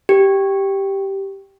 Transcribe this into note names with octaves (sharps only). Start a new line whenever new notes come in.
G4